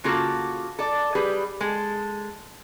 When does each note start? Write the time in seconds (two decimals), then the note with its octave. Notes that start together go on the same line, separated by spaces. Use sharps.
0.04 C#3 A#3 F4 F#4 A4
0.79 A4 D5
1.15 G3 G4 G#4 B4
1.60 G#3 A4